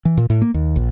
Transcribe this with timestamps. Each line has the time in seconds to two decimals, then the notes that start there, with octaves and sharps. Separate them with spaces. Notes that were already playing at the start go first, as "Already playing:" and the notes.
0.05 E3
0.17 A#2
0.30 A2
0.42 A#3
0.54 D#2
0.76 A#1